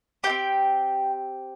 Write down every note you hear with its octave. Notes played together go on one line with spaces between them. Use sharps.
E4 G4 G5
C4